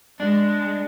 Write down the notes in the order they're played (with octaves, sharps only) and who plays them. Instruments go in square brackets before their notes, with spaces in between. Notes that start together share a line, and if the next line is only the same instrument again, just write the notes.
[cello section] G#3 [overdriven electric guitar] D4